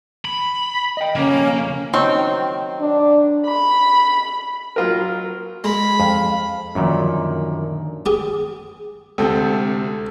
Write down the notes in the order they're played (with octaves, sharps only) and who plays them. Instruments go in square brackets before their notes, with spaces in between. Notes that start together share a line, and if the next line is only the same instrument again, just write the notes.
[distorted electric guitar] B5
[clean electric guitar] D#5 G5
[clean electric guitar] F2 C#3 [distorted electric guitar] A#3 [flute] C#4
[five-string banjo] D#3 F#3 C4
[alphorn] D4
[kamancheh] B5
[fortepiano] F#3 F4 A#4
[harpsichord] G#3 [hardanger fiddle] B5
[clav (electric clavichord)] F2 [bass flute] F5
[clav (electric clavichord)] F#2 A#2 [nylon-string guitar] D3 D#3 F3
[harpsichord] G4 G#4
[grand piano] D2 C3 G6 [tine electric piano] G#3 C4 [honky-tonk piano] A4